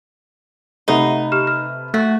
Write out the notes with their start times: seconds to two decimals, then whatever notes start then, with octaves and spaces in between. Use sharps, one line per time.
0.88 C3 A3 D#4 G4 A4 B4 F#5
1.32 G4 F6 E7
1.47 F6
1.94 A3 F#4